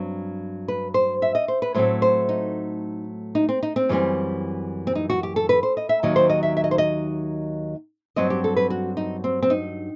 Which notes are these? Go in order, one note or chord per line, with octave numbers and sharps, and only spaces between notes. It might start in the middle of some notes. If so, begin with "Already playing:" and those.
Already playing: G2 F#3 C4
B4
C5
E5
D#5
C5
B4
A2 F#3 A3 C4 C5
C5
D#4
D#4
C4
D#4
C4
F#2 E3 G3 C4
C4
D#4
F#4
G4
A4
B4
C5
D#5
E5
D#2 D#3 F#3 D#5
C5
D#5
E5
E5
D#5
C5
D#5
G2 F#3 C4 D#5
G4
A4
B4
F#4
D#4
C4
C4
D#4